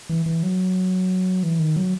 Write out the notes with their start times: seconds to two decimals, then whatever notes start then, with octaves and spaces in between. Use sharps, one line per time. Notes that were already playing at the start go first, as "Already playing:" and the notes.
0.09 E3
0.26 E3
0.43 F#3
1.43 E3
1.59 D#3
1.76 F#3